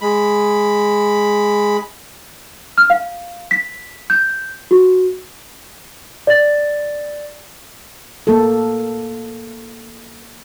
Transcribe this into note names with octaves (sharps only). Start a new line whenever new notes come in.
G#3 B5
F6
F5
B6
G6
F#4
D5 A6
A#3 A4